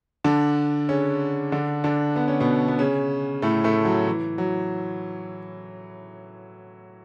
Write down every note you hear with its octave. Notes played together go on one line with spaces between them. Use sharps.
D3 D4
C#3 C#4
D3 D4
D3 D4
B3
C#4
B2 B3
B3
C#3 C#4
A2 A3
A2 A3
F#3
E3
F#3